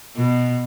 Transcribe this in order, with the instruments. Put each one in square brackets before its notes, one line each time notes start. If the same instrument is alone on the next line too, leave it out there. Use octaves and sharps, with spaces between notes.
[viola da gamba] B2